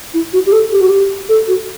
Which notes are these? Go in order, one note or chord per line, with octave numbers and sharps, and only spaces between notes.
E4
F#4
G4
A4
G4
F#4
G4
A4
F#4